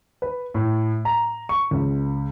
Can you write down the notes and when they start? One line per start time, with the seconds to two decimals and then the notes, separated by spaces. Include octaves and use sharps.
0.22 B4
0.54 A2
1.05 A#5
1.49 C#6
1.71 C#2